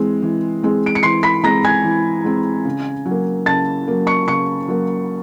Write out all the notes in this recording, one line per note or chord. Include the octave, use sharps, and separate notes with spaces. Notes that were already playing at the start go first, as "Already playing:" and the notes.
Already playing: E3 G#3 C4
E3
G#3 C4
D7
C#7
E3 C6 C7
B5 B6
G#3 C4 A#5 A#6
G#5 G#6
E3
G#3 C4
C#3
F#3
A#3
C#3 A5 A6
F#3 A#3
C#6 C#7
C#3 C#6 C#7
F#3 A#3